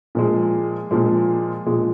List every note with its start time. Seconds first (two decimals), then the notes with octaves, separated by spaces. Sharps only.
0.15 A#2 F3 G#3
0.91 A#2 F3 G#3
1.66 A#2 F3 G#3